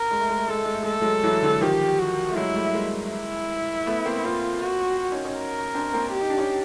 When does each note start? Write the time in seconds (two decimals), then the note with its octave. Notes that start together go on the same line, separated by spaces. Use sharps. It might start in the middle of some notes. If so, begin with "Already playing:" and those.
Already playing: A#4
0.11 G#3
0.21 A3
0.29 G#3
0.39 A3
0.47 G#3 A4
0.56 A3
0.65 G#3
0.74 A3
0.83 G#3 A4
0.93 A3
1.01 F#3 G#3
1.23 E3 F#3
1.42 D3 E3
1.61 D#3 F3 G4
1.99 F#4
2.30 A3
2.36 F#3 G#3 E4
2.55 G3 A3
2.74 G#3 A#3
3.12 E4
3.86 A3 B3
4.05 A#3 C4
4.24 A#3 C4 F4
4.62 F#4
5.12 C#4 D#4
5.25 C#4 D#4
5.37 A#4
5.74 C4 D4
5.93 A#3 C4
6.12 G4
6.21 D#4
6.30 D4
6.38 C#4 D#4